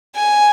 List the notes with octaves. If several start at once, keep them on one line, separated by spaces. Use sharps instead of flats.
G#5